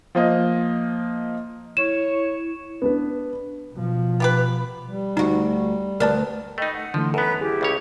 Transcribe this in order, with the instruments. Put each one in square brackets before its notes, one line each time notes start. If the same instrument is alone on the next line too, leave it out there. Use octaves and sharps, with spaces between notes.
[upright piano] F3 A#3 D#5
[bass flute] E4 [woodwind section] C#5 [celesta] E7
[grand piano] B3 D4 B4
[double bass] B2 F3
[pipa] B3 G4 B4
[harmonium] G3
[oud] D2 F#4 [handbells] D#4
[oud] D2 B3 [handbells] A#4 D5 A5
[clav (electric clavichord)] A3 D#4 [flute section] D#5 G5 B5
[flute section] F#5
[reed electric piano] D3 E3 A3 [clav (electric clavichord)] F3 [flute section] C6
[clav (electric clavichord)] F#2 B3 [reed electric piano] A4 [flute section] B4 F#5 A#5
[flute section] E4 G4 [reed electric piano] G#4
[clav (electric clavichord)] C#2 C#3 C#5